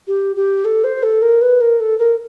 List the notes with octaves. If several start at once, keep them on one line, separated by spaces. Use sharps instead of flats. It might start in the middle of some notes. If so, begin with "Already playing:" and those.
G4
G4
A4
C5
A4
A#4
B4
A#4
A4
A#4